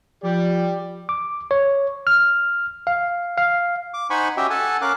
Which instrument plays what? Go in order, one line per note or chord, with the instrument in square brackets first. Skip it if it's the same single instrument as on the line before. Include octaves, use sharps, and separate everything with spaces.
[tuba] F3 [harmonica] G4 D5
[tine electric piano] D6
C#5
F6
F5
F5
[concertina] D6
D#4 C5 F#5 G#5 B5 C#6
C#4 F#4 G4 D#5 E5 G5
A4 F#5 G#5 A5
C#4 A#4 F5 D6 F#6